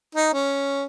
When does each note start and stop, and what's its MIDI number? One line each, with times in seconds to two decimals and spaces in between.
0.15 0.29 63
0.33 0.85 61